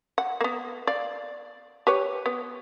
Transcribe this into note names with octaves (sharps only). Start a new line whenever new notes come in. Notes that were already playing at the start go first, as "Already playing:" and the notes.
F#5
A#3 B3
D5 F5
G4 B4 C#5
B3